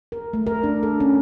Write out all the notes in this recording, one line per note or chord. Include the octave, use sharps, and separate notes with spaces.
A#4
A3
A#4
D4
A4
C#4